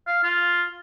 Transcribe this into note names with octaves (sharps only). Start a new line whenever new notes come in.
F5
F4